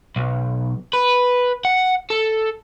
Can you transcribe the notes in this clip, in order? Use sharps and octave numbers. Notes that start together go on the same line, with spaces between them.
B1
B4
F#5
A4